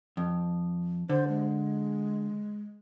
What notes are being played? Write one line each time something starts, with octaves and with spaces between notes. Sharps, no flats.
F2
D3 C5
G#3